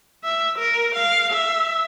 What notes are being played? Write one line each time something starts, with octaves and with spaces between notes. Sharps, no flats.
E5
A#4
F5
E5